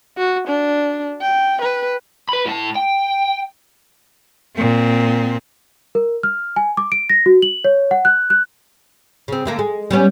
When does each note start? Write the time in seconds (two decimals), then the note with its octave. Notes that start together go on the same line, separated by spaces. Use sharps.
0.18 F#4
0.48 D4
1.21 G5
1.62 B4
2.29 B4 B5
2.46 A2 A5
2.76 G5
4.56 A#2 C4
5.95 A#4
6.23 F6
6.56 G#5
6.77 D6
6.92 D7
7.10 A#6
7.26 F#4
7.42 F#7
7.65 C#5
7.91 F#5
8.05 F#6
8.30 F#6
9.28 C#3 C4
9.45 D3 A3 A#3
9.59 G#3
9.91 G3 B3 C#4